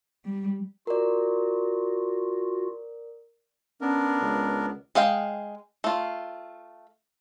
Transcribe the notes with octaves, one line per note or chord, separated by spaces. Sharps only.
G3
F4 F#4 A#4 D5
B3 C#4 D4 A#4
C#2
G#3 D#5 F5 G5
A3 F4